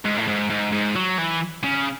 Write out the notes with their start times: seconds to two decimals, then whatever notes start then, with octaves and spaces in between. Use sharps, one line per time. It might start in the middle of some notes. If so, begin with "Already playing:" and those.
0.05 G#2
0.17 A2
0.28 G#2
0.50 G#2
0.72 G#2
0.96 F#3
1.18 E3
1.63 C#3